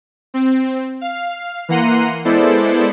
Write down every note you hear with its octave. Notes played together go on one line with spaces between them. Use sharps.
C4
F5
E3 A#3 F#5 A#5 C6 D#7
G#3 B3 E4 A4 C5 D5